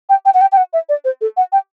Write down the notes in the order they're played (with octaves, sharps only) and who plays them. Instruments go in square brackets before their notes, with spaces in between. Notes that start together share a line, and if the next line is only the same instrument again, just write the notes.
[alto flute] G5
G5
F#5
G5
G5
F#5
E5
D5
C5
A4
F#5
G5